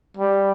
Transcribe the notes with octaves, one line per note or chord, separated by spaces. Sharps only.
G3